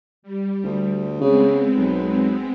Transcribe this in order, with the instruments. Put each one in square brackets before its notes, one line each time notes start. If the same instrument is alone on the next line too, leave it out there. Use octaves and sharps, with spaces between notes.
[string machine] G3
[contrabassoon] D2
[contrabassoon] C#3 [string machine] G#3 B3 C4
[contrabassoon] B1